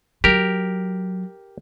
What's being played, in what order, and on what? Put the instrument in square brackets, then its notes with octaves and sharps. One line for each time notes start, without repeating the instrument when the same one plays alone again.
[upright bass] F#3 [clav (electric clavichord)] G4 A#4